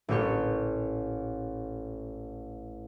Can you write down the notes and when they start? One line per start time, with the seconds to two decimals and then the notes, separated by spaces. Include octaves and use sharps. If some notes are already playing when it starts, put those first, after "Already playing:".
0.09 A1 A#2 G4 C#6